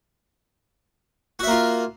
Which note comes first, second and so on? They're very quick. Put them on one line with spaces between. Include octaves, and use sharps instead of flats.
F#4 E5 A#3 F4